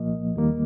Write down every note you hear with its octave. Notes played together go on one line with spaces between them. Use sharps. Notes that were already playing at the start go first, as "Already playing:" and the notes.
Already playing: C2 A#2 F3 A#3 D#5
D#2 D#3 G3 A#3